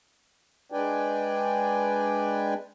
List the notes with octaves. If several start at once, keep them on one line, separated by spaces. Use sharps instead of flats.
G#3 D4 B4 D5 G5 G#5